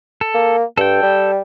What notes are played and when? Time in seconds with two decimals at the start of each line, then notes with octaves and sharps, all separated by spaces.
0.21 A4
0.35 A#3
0.78 G2 A4 G5
1.03 G3